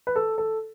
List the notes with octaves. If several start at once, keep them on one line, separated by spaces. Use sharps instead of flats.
B4
A4
A4